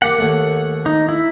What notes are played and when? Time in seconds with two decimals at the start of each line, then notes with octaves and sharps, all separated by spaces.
0.02 A#3 G4 F#5
0.18 D#2 A3
0.86 D#4
1.09 E4